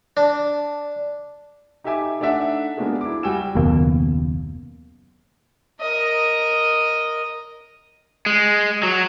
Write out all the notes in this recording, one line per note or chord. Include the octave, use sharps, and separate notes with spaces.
D4
D#4 G4 A4 E5 G#5 D6
A3 D4 D#4 D5 E5 F#5
G#3 A#3 B3 D4 F#4 G#4
E4 D6
G3 F#4 G5 G#5 E6 E7
F#1 D#2 B2 A#3
A#4 D#5
G#3
F#3